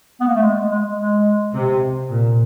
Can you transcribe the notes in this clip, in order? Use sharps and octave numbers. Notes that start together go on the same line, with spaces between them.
B3
A#3
A3
G#3
G#3
G#3
C3
A#2